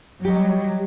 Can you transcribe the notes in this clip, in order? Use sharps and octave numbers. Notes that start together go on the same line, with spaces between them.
F#3 G3 G4 D#5